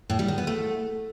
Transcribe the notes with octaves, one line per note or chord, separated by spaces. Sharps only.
A2
G3
D#3
B3
A3